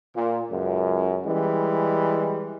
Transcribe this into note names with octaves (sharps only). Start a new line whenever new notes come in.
A#2
C#2 F#2
E3 G3 G#3